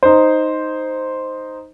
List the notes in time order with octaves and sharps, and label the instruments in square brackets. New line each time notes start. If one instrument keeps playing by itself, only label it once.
[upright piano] D#4 C5